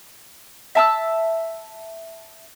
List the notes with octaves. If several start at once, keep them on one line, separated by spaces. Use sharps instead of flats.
E5 A5 E6